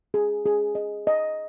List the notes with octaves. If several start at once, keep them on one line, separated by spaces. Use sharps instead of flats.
G#4
G#4
D#5
D#5